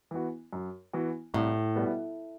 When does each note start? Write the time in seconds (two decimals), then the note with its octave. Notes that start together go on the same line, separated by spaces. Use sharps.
0.11 E3 B3 F#4
0.53 F#2
0.93 E3 B3 F#4
1.34 C2 A2
1.76 B2 G3 B3